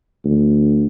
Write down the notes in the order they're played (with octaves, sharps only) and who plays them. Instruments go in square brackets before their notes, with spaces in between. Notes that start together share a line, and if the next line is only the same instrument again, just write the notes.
[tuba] D2